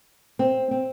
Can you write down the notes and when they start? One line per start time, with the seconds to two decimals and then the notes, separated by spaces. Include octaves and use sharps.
0.39 C4
0.71 C4